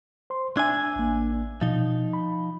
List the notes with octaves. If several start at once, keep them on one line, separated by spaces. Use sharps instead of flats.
C5 C6
D4 E5 G#5 E6 G#6
A1 A#3
B2 F3 D#4
B5